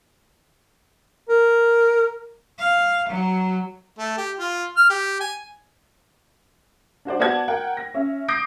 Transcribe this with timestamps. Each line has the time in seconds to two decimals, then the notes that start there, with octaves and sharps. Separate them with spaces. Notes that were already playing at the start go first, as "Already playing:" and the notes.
1.29 A#4
2.59 F5
3.09 F#3
3.99 A3
4.17 G4
4.39 F4
4.77 F6
4.90 G4
5.20 G#5
7.05 D4 F#4 C5 D5
7.19 B3 F#4 D5 A5 G#6
7.48 A#4 F#5 G5
7.77 A#6
7.94 C#4 E5
8.28 D6 D#6 G6 A#6 C7 D7